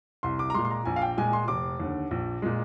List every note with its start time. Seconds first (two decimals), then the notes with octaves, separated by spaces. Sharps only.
0.23 C2 C6
0.39 D6
0.50 A#5
0.54 G#3 C6
0.58 A#2
0.65 C6
0.71 A#5
0.85 A#1 G#5
0.96 F5
1.02 G5
1.17 A#2 G#3 G#5
1.33 C6
1.48 F1 D6
1.80 D#2 D3
2.11 A#1
2.42 A#2 G#3